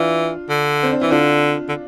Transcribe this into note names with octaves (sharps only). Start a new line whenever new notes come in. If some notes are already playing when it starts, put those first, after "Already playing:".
Already playing: E3 D4 F4
D3
C4
D4
E3 E4
D3 D4 F4
D3